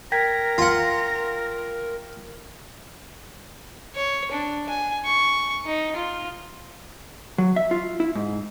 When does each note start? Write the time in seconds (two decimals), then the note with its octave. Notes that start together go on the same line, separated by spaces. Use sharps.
0.12 A#4 G5 A#5 G#6 B6
0.58 F4 F#5
3.95 C#5
4.32 D4
4.69 G#5
5.05 C#6
5.65 D#4
5.96 F4
7.38 F#3
7.56 E5
7.71 F4
8.00 E4
8.15 G#2